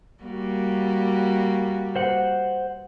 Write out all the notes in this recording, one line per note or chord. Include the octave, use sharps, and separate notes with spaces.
G3 A#3 F#4
C5 F#5